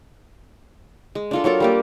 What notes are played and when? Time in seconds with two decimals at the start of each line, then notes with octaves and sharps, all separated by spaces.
1.15 G#3
1.31 D4 F4 A4
1.44 F#3 F4 A4 A#4
1.60 G3 A#3 G4